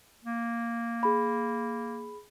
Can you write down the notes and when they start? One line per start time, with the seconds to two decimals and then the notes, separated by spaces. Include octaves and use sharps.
0.25 A#3
1.03 G#4 B5